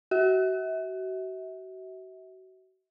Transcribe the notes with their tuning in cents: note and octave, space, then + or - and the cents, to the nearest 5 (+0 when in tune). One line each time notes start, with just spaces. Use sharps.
F#4 +30 E5 -35